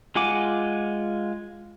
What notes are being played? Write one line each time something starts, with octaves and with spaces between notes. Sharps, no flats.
G#3 F4 F#5 G#5 D6